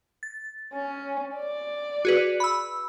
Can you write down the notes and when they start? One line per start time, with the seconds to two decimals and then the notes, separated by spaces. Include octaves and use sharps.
0.23 A6
0.74 C#4
1.36 D5
2.05 F#4 G#4 B4
2.40 B5 E6